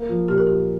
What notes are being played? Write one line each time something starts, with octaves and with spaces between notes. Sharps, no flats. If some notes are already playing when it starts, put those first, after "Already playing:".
Already playing: A#3
F3
A#2 G4
A#4
F4 G4